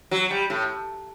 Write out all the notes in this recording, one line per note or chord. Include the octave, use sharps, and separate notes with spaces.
F#3
G3
A2